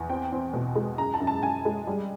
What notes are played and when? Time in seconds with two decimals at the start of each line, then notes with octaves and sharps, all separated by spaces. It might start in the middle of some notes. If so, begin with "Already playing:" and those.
Already playing: E2
0.10 C4 G5
0.32 C4
0.53 B2
0.76 G#3
0.98 F#2 A#5
1.14 A5
1.20 F#2
1.27 A5
1.42 F#2 G#5
1.65 G#3
1.87 G3